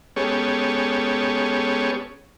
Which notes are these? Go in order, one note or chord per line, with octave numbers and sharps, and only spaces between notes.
G#3 B3 C#4 G4 A4 C#5